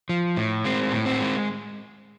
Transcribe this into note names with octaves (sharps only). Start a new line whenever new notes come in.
F3
A2
G#3 C4
A2
C4
G#3